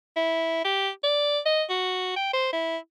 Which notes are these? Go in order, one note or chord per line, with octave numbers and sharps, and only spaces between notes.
E4
G4
D5
D#5
F#4
G5
C5
E4